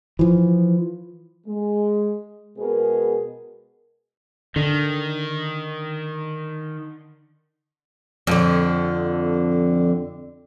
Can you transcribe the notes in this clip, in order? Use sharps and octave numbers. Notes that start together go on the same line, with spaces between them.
E3 F3
G#3
B2 G#3 B3 G#4 A#4
D3 D#3
F2 D3